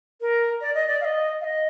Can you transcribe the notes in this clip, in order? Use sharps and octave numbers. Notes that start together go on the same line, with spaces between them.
A#4
D5
D#5
D5
F5
D#5
F5
D#5